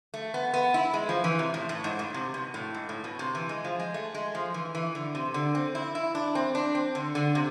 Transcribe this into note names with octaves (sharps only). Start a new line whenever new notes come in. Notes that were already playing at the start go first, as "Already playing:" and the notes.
A3
B3
B3
E4
G#3
F3
E3
C3
A2
A2
G#2
A2
C3
B2
A2
G#2
A2
B2
C3
E3
G#3
F3
G#3
A3
G#3
F3
E3
E3
D3
C3
D3
C4
E4
E4
D4
C4
D4
C4
D3
D3
C3